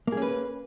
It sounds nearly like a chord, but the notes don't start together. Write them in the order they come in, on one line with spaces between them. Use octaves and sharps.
A#3 G#4 C#4 B4